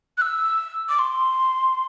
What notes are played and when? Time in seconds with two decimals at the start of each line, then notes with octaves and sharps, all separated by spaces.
0.18 F#6
0.22 E6
0.89 D6
0.99 C6